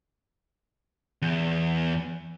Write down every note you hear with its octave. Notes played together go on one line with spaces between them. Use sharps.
E2